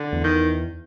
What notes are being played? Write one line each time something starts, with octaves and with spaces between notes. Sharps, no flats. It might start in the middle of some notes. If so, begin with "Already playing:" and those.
Already playing: D3
E2
D#3